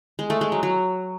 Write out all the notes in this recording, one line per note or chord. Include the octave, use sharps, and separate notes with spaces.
G#3
A3
G#3
F#3
F#3